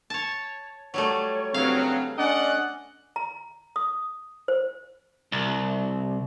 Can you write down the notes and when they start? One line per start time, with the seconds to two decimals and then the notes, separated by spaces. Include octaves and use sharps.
0.10 C#5 A5
0.94 F#3 G3 A3 C#5
1.54 G2 C#3 F#3 C4 F5
2.18 C#4 D4 D5 D#5 F#5
3.16 A#5
3.76 D#6
4.48 C5
5.32 C2